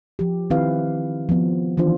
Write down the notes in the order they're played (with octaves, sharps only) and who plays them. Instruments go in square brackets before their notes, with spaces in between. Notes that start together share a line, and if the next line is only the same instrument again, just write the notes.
[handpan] F3 G4
D#3 C4 E4 G4 B4 F5
F3 B3
D#3 E3 D4 F4 C5